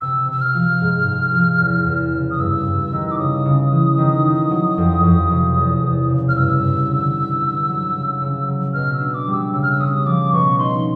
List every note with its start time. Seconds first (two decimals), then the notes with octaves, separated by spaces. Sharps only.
0.01 C3 E6
0.28 C3 E6
0.41 F6
0.55 F3
0.81 G#2
1.07 G#2
1.34 F3
1.60 E2
1.86 E2
2.13 C#3
2.31 D#6
2.39 G2 E6
2.66 G2
2.92 D#3
3.11 D6
3.19 C#3 D#6
3.45 C#3
3.72 E3
3.98 D#3
4.25 D#3
4.51 F#3
4.78 F2
5.03 F2
5.30 C3
5.57 E2
5.83 E2
6.10 C#3
6.29 F6
6.36 G2 E6
6.62 G2
6.89 D3
7.15 D3
7.42 D3
7.69 F#3
7.95 C#3
8.21 C#3
8.48 F#3
8.74 B2 F6
8.94 E6
9.00 D4
9.14 D6
9.27 G3
9.33 E6
9.53 C#3 E6
9.63 F6
9.71 E6
9.80 C#4 D#6
10.06 F3 D6
10.32 B2 C#6
10.59 D#4 C6